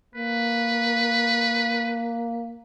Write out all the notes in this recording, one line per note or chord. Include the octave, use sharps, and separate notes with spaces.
A#3 B4